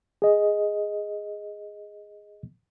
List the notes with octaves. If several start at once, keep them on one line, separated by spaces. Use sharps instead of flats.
G#4 D#5